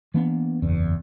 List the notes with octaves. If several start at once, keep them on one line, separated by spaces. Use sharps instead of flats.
E3 A#3 B3 D4
F#1 E2